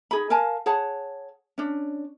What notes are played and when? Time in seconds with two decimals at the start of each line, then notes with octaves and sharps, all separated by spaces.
0.11 D#4 G#4 B5
0.30 A#4 F5 G#5 A5
0.66 G#4 C#5 F#5 A5
1.58 C#4 D4